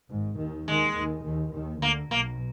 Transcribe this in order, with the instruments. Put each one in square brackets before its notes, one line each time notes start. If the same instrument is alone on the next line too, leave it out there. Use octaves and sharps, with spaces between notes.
[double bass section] G#1 G#2
D#2 D#3
[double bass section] D#2 D#3 [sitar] G#3
[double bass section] D#2 D#3
D#2 D#3
D#2 D#3
[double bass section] D2 D3 [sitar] A#3
[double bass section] B1 B2 [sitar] A#3